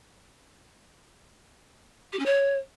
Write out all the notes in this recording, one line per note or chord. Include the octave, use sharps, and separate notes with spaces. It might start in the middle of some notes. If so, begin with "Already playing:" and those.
G4
C#4
C#5